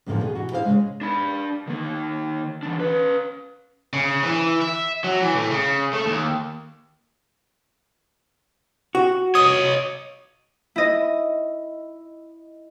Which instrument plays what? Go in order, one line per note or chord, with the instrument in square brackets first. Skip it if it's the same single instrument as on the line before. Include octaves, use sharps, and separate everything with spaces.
[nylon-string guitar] E2 A2 D3 F3 A#3 D4
B2 G#4
E3 F#4
E4 G#4 C5 C#5 F5
C#3 G#3
[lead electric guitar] D4 B5
D#3 A#3
E3 D4
C#4 B4
[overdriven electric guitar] C#3
E3
E5
F#3
E3
A2
C#3
A3
D#2
[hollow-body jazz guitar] F#4
[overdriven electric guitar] C#5 D#5 [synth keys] D#6
[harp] E4 D#5